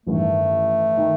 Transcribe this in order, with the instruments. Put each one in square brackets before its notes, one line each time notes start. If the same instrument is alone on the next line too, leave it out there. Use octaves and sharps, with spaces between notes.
[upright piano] A1 G2 D#3 [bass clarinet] A3
[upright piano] D#3